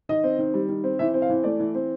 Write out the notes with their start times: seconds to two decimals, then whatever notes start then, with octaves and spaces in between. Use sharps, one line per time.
0.09 D#3 D#5
0.24 C4
0.39 D#3
0.54 G3
0.69 D#3
0.84 C4
0.99 E3 E5
1.14 C4
1.22 F5
1.30 E3
1.44 A3 D5
1.59 E3
1.75 C4